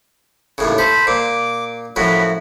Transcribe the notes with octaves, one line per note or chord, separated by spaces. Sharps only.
D#2 A2 C#3
A4 C5 B5
A#2 D6
F#2 A2 F3 F#4 B5